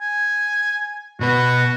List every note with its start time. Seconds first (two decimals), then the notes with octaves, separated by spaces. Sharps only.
0.01 G#5
1.20 B2 F#4 B4